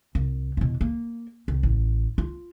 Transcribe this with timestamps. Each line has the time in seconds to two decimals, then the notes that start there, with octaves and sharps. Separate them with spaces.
0.15 C2
0.57 E2 B2
0.81 A#3
1.48 C2
1.63 A1
2.18 F4